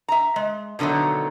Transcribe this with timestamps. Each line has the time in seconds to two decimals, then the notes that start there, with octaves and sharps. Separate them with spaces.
0.08 E5 A#5
0.36 G#3
0.79 B2 D3 D#3 F#3 A3